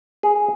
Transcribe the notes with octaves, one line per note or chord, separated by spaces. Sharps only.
G#4